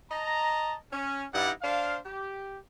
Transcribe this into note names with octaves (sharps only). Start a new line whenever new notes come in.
D#5 A5 A#5
C#4
G2 D#4 E4 D5 F#5
D4 C5 F5
G4